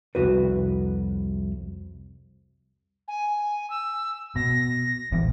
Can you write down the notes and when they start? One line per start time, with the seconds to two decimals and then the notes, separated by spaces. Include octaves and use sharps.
0.15 C2 F2 A#2 F#4 B4
3.08 G#5
3.70 E6
4.36 B2 A#6
5.12 E1 A#1 E2